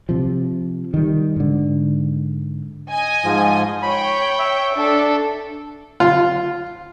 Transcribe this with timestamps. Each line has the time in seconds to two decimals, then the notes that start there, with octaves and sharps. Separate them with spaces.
0.09 C3 F3
0.94 D#3 G3
1.36 G#2 D3
2.90 D#5 G#5
3.24 G#2 F3
3.82 C#5 G5 B5
4.39 E5
4.73 D4 A4
6.00 F4